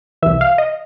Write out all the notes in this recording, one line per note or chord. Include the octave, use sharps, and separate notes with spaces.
C2 C3 E3 E5
F5
D#5